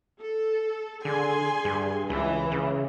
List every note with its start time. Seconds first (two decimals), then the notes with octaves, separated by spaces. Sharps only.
0.21 A4
1.05 D3 G#4 G#5 C6
1.65 G2
2.10 C#2 E3
2.52 C#3